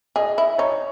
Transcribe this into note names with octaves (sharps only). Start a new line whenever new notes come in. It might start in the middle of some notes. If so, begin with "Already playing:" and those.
G#4 D#5
E4
D#4 C#5